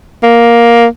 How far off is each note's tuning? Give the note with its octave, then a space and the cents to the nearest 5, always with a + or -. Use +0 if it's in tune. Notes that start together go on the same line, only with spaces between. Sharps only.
A#3 +10